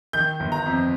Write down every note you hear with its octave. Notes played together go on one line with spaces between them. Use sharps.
D#3 G6
G1
A#5
F2